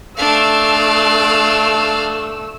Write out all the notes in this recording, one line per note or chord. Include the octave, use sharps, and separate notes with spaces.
A3 D4 F5 E6